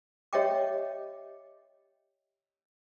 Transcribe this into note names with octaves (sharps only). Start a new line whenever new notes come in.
G4 C#5 D#5 E5 G5 D6